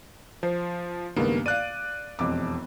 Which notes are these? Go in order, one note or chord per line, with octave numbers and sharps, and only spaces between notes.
F3 C5
C#2 G2 D#3 A#3 B3
D5 F5 F#6 D#7
E1 F2 D6